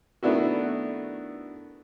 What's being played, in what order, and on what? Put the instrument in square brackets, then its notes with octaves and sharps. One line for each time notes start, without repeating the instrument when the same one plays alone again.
[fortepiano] D#3 A3 B3 D4 E4 F#4